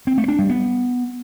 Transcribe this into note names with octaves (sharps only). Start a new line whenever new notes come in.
C4
A3
D4
G3
B3